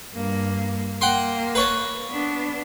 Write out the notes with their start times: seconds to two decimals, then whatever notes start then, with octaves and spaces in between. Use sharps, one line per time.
0.14 G2 A#3
1.01 A#3 F#5 G5 C6
1.55 B4 C#5 A5
2.08 B3 D4